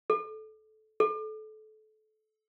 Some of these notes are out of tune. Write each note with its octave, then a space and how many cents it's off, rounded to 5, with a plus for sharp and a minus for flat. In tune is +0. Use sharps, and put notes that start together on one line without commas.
A4 -20
A4 -25